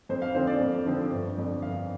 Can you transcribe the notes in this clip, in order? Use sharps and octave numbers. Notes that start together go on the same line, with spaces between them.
F2 C5
F5
D3 F3 C4 C5
D5
F2
D3 F3 C4
G1
F2 F3 D4
G1 F5